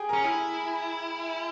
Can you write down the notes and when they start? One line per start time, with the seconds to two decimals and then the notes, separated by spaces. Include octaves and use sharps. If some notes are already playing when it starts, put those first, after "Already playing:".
Already playing: G4 G#4 G5 G#5
0.09 C#4 A#4 A#5
0.24 E4 G#4 G#5